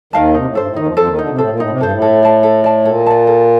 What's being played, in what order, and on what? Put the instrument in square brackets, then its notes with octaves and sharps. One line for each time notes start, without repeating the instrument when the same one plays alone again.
[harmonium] D#2 D#3 [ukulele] A#4 F5 A5
[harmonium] C3 [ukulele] D#4
[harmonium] A2
[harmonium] G2 [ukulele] A4 C5
[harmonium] A2
[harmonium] D#2 D#3 [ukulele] D#4
[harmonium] F2 F3
[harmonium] F2 F3 [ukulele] A4 C5
[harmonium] D#2 D#3
[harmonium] D2 D3 [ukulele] D#4
[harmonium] C3
[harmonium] A2 [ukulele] A4 C5
[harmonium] A#2
[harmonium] A2 [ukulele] D#4
[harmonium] C3
[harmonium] G2 [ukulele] A4 C5
[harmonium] A2
[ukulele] A4
D5 A5
A4
D5 A5
[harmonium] A#2 [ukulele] A4
[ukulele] D5 A5
A4